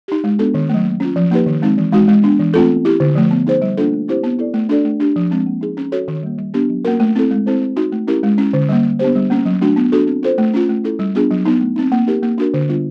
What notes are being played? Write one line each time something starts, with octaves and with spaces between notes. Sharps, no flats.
D#4 G4
G#3
B3 D4 F#4 A4
D#3
F#3 A3
A#3
C#4 F4
F3
A#3 D#4 G4 B4
D#3
G#3 C4 D#4
E3
G#3 C4 D#4 F#4
G#3
B3 D4
E3
A3 C4 F4 A4
B3
E4 G4
D3
F3 A3
B3
D#4 G#4 C5
G3
A#3 D4 F4 A4
A3
C4 E4 G4 C5
B3
E4 A4 D5
A3
D4 F#4 A4 D5
A3
D4 G4
F3
G#3 C4
A#3
D#4 G#4
C#4
F#4 A4 C#5
D#3
G3 A#3
G3
B3 D4 G4
F#3
A#3 C#4 F#4 A#4
A3
C4 E4 A4
G#3
C4 E4 A4 C5
C4
D#4 F#4
A3
C#4 E4 G4 A#4
G#3
C#4 E4
D3
G3 A#3
G3
B3 D4 G4 C5
G3
A#3 C#4
F#3
A3 D4 F#4
B3
D4 F#4 A4
C4
F4 A4 C5
A3
C#4 F4
A3
C#4 E4 A4
G3
B3 D4 F4 G#4
F#3
B3 D#4
A3
C4 D#4
A#3
D#4 G4 A#4
A#3
D4 F#4 A#4
D3
G3 B3 D4 F4